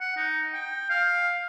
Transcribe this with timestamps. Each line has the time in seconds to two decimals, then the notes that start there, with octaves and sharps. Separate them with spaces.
0.01 F#5
0.16 D#4
0.54 G5
0.90 F5